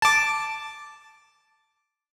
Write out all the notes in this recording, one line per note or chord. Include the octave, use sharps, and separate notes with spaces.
A5 D6